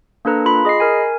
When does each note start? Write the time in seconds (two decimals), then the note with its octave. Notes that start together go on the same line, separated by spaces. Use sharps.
0.25 A#3 D4 A4 B4 A#5
0.45 F4 B5
0.65 G#4 D#5 B5 C7
0.80 A#4 G#5